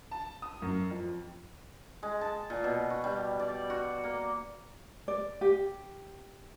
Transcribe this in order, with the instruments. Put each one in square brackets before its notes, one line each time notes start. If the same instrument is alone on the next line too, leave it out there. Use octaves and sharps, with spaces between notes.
[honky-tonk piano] A5
D#6
F#2
F2
[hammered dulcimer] G#3
A5
A#2
B2
F#4
G3
D5
F#4
A#3
[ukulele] D5
G4